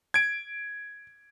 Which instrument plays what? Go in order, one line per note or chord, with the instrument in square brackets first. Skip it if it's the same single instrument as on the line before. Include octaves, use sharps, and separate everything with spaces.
[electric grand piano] G#6 D7